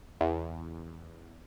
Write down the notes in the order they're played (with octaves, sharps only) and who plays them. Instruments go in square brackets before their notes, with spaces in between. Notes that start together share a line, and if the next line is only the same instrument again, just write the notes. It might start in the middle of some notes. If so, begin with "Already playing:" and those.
[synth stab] E2